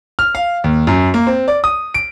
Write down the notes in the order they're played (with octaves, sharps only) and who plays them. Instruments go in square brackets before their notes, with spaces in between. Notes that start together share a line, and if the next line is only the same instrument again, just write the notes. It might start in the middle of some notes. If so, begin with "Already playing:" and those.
[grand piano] F6
F5
D#2
F#2
A#3
C4
D5
D#6
D7